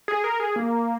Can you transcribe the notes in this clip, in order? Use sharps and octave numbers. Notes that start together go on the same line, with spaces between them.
G#4
A#4
G#4
A#3